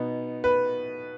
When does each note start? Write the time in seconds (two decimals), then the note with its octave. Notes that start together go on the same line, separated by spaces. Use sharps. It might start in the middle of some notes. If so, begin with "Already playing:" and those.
Already playing: B2 B3 D#4
0.44 B4